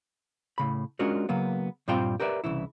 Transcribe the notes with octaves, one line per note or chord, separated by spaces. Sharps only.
A2 C#3 B5
G#3 C#4 D4 F4 F#4 A#4
C#3 F#3 A#3 B3
G2 A#2 G3 C4 F4 G5
G4 A#4 B4 D5 E5
C2 C#3 E3 E4